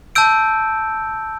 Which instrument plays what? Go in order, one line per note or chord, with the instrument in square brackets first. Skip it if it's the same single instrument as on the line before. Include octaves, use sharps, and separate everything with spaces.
[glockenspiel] A5 E6 G6 D7